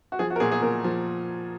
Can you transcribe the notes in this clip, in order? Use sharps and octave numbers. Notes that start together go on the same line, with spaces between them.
F#4
F3 G#4
F#4
A#4
A#2 G#4
G#4
A#2 A#4
F3